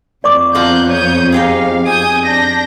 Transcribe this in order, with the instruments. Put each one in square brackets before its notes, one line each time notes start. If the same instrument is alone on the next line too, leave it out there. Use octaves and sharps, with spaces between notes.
[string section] F2 [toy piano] D5 C#6 D6
[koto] B2 F3 A#3 [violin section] F#6 G6
[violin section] C#5 D#6 G6
[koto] D#4 G4 G#4 [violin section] F5
[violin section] G#5 D#6 G6
D4 G6 A#6